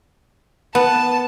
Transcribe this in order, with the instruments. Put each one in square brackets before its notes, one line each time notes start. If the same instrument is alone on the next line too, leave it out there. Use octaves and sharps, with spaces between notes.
[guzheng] B3 [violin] A5